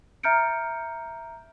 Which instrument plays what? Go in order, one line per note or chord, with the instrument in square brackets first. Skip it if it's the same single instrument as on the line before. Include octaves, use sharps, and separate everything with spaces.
[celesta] E5 A#5 F6 G6 C#7 D7